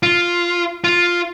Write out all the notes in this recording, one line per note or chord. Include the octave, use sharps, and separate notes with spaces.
F4
F4